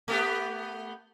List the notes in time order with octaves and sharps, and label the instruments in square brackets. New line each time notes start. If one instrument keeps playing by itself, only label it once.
[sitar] A3 B3 G4